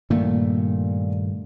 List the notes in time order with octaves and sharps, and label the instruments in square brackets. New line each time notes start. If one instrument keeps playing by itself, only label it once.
[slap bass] G2 D#3 A3 [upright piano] A#2